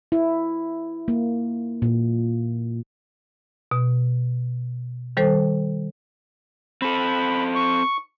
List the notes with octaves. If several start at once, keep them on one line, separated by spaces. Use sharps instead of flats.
E4
A#3
A#2
B2
D#3 G3 A4 C5
C4 A4 B5
C#6